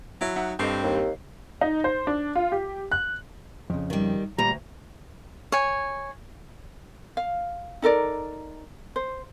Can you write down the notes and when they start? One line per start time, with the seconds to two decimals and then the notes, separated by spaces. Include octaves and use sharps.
0.21 F#3 E4 E5
0.36 D#4 E5 F#5
0.59 G2 C4 G4 A4 D#5 C7
0.83 D#2
1.61 D#4
1.84 C5
2.07 D4
2.35 F4
2.52 G4
2.92 F#6
3.70 F2 C#3
3.90 D#3 G3
4.38 D2 A#2 G3 A#5
5.52 C#5 G#5
7.17 F5
7.82 D#4 A4 A#4 D5
8.96 C5